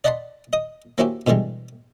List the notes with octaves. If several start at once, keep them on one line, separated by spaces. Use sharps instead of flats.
D5 D#5 F#5 A5 B5 C6
D#5 D#6
A#3 C4 C#4 E4 F#4 G4
B2 D3 E3 G3 G#3